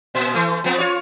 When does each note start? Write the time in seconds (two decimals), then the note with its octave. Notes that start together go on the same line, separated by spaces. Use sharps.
0.15 A#2
0.34 E3 A3
0.64 F3 B3 C4
0.78 F4 C#5